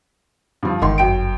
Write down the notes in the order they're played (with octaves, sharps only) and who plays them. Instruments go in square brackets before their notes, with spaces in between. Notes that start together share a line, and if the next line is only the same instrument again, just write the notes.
[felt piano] G2 F3
[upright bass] G1 [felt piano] G#2 D#3 C6
[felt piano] F#2 G5 D7